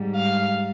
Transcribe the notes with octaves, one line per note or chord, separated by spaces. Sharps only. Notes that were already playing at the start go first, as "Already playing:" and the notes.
Already playing: G#2 G3
F5